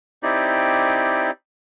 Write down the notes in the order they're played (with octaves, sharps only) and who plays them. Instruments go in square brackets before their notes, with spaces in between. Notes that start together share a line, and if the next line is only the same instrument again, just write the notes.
[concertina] C4 D#4 E4 G4 D5